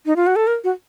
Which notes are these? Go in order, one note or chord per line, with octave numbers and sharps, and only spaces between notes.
D#4
F4
F#4
A4
A#4
F#4